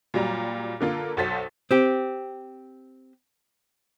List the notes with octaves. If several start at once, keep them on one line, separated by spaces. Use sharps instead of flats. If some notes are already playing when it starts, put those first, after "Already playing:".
A#2 F#3 G3 A#5
D3 A#3 F4 A4
B1 F#4 A4 C5 A6 B6
C4 G4